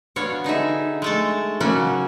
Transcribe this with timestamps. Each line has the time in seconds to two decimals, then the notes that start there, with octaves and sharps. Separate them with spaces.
0.16 B3 D4 F#4 C#5 F5
0.44 D3 D#4 G#4 E5
1.02 G#3 A3 A4
1.60 C#3 F#3 A#3 C#4 F#4